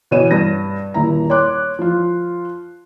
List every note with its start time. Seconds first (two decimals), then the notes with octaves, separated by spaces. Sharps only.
0.11 B2 E3 C#5 D#7 E7
0.31 G2 A#6
0.94 D#1 E4 A#5
1.30 C#5 C6 D6 F#6
1.79 F3 F4